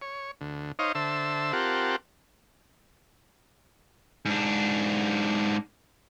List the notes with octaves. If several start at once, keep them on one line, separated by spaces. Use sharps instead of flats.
C#5
D2
D#4 C5 C#5 D#5 F5
D3 C5 E5 A5 E6
C4 F4 G4 A#4 F#5 A5
G#2 D4